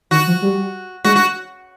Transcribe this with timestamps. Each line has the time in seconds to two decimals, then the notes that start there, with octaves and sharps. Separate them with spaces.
0.11 D#3 F#4
0.27 F3
0.42 G3
1.04 G#3 F#4
1.16 F#4